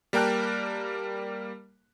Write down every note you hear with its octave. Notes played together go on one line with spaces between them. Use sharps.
G3 A#3 A#4 G5 A5 F#6